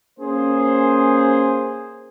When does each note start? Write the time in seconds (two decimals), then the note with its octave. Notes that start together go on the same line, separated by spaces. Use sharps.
0.19 A#3 C#4 G#4 C5